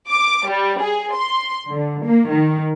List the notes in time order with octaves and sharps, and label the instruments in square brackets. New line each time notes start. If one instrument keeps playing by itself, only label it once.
[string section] D6
G3
G#4
C6
D3
A#3
D#3